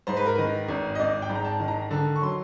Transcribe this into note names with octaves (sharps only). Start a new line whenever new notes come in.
G#2 C5
B4
A#4
D#3 B4
G#1
D#5
G#1 D5
G5
G#2
A#5
A5
D#3
A#5
D3 A5
C#6
F#3 C6